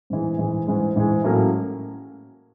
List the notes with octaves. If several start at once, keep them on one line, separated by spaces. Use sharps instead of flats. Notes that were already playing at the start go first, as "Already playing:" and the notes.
G#2 E3 G#3
G#2 E3 G#3
G#2 E3 G#3
G#2 E3 G#3
A2 F#3 A#3 C#4